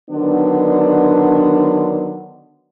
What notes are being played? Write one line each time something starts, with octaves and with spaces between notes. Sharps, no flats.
D3 D#3 F#3 B3 D4